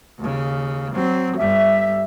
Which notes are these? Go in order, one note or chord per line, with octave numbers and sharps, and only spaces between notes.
D#2 C#3
F#3 C4
G1 G3 E5